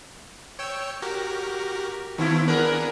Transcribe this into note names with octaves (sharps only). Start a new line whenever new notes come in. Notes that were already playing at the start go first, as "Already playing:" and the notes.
C#5 G5 E6
F#4 G4 A#4
D#3 B3 C4 E4 F4
B3 D4 G#4 A#4 B4